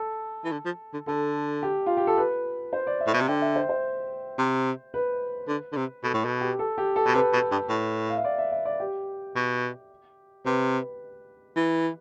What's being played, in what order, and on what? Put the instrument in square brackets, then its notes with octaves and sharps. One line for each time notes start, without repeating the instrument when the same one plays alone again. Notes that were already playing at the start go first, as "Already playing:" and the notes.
Already playing: [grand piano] A4
[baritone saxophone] E3
D3
F3
D3
[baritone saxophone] D3 [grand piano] A4
[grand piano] G4
F4
G4
A4
B4
C5
D5
E5
[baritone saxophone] A2
[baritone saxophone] B2 [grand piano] E5
[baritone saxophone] C3
[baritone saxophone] D3 [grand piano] G5
[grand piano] E5
C5
C5
[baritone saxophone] C3
[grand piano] B4
[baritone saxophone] D3
D3
C3
[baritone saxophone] B2 [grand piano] A4
[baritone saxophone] A2
B2
[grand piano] G4
A4
G4
A4
[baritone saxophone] B2
[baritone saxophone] C3 [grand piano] B4
[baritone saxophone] B2
G2
A2
[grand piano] F5
E5
D5
E5
E5
D5
G4
[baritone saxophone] B2
[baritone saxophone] C3 [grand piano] B4
[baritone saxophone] E3